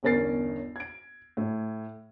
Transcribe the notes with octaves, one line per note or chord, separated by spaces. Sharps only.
G1 E2 C#4 A#4 A6 C7
G#6 D7
A2